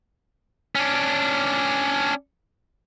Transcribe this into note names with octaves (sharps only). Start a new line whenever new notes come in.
C#4 D4